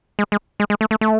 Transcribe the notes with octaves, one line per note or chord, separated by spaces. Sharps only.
G#3
G#3
G#3
G#3
A3
A3
A3